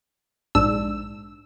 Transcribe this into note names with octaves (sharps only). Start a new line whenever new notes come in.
A#1 G#2 D4 E6